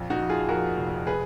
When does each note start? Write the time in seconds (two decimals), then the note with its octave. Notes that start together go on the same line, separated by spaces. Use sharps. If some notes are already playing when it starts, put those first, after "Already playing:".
Already playing: A#1 F2
0.10 D#4 F#4
0.19 F3
0.29 F4 G#4
0.49 F2 F#4 A#4
0.78 F1
1.07 G#4 B4